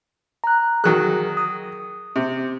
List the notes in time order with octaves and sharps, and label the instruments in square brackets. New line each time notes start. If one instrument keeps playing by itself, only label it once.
[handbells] A#5 F#6
[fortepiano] D#3 F#3 F#6 [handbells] G#4 A#4
[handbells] D#6
[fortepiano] C3